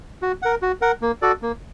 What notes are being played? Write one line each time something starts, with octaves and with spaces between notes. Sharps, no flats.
F#4
A#4 F#5
F#4
A#4 F#5
A#3
F#4 A4 D5
A#3